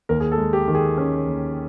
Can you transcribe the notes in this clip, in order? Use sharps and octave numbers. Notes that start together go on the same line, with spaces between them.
D#2 A#4
G#4
A4
G#3
G4
D#3
G#4
C#4
D#2